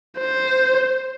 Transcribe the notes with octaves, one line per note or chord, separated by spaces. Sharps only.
C5